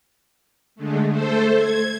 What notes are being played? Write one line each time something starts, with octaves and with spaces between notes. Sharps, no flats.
D3 G#3 A3
A3 A4 C5
G#6